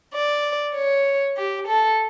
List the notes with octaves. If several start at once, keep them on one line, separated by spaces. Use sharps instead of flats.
D5
C#5
G4
A4